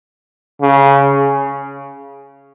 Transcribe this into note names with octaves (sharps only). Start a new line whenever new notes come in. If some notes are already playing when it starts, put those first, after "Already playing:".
C#3